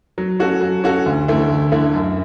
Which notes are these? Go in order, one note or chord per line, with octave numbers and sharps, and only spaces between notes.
F#3
C#4 F#4 A4
F#3
C#4 F#4 A4
D2
D3 A3 E4
D2
D3 A3 E4
F#2